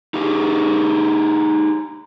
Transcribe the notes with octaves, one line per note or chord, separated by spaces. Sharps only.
D#4 G4 G#4